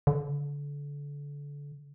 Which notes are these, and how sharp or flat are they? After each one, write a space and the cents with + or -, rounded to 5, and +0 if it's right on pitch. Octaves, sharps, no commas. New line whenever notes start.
D3 -30